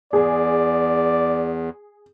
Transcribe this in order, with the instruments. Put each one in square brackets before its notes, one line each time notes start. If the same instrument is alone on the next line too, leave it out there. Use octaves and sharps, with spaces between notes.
[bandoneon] E2 [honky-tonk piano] G#4 [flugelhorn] D5